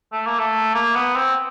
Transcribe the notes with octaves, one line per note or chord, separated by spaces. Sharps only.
A3
A#3
A3
A#3
B3
C4